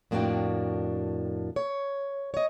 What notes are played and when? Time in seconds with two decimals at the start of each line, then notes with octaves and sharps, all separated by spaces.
0.11 F2 A2 A#3 D4 F#4 G5
1.56 C#5
2.34 C#5 D#5